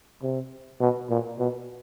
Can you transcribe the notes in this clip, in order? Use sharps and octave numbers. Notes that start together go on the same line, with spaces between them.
C3
B2
A#2
B2